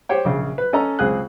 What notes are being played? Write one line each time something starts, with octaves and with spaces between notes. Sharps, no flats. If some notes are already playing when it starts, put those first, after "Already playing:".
G4 C5 C#5 G5
A#1 C#3
B4
C#4 A4 D#5 A#5
C#2 C4 G#4 F#6